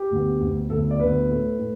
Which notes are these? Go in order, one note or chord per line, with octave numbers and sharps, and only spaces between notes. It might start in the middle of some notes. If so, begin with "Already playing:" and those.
Already playing: G4
D2 D3 B3
D2 D3 B3
D2 D3 B3 A4
D5
D2 D3 B3 B4
A2 A3
A2 A3